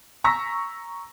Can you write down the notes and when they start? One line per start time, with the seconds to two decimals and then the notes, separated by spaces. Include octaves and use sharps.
0.24 A#5 C#6 E6 A#6 B6